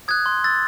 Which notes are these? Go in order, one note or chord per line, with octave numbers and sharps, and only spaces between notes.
D#6 F#6 G#6
C6
E6 A6